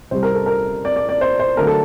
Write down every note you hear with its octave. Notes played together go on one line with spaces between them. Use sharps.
C2 C3 G3 C5
A#4
A4
A#4
D5
D5
D5
C5
C5
D3 F#3 A3 A#4
A4